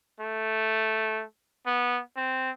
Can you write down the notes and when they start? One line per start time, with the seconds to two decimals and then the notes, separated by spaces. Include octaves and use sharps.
0.21 A3
1.66 B3
2.17 C4